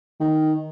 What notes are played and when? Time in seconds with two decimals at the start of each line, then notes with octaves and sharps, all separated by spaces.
0.20 D#3